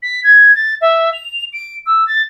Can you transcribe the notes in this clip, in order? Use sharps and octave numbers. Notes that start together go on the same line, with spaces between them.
B6
G#6
A6
E5
F7
D7
E6
A6